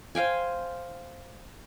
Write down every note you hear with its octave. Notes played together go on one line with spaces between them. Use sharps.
C5 F5 G5 G#5